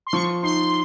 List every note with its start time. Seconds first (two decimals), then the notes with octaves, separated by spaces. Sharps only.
0.07 C6
0.13 F3 C#6
0.43 D#4 C6